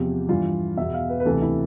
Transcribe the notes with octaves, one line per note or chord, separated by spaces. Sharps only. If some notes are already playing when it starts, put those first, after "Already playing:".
Already playing: E2 C3 F3 G4
G2 E3 F4
E2 B2 E5
F5
B4
B4
D2 C3 E3 A4
E4